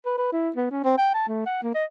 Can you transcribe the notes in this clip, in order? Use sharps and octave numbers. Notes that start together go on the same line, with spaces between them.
B4
B4
E4
B3
C#4
C4
G5
A5
A3
F#5
A#3
D#5